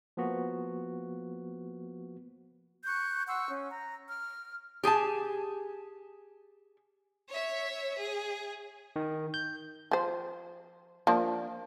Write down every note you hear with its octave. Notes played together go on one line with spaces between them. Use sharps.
F3 A#3 B3 F#4
C#6 F#6 G6
F#5 C6 C#6 E6
C#4
A#5
F6
G4 G#4 G#5 A5
C#5 E5
G#4
D#3
G6
F3 C5
F3 A#3 D4